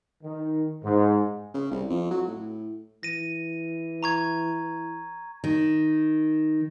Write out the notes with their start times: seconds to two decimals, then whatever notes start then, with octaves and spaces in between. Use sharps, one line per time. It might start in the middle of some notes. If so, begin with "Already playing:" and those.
0.24 D#3
0.84 G#2
1.54 C#3
1.71 C2
1.90 F2
2.11 F#3
2.28 A2
3.03 E3 A#6 D#7
4.03 A#5 C#6 G#6
5.44 D#3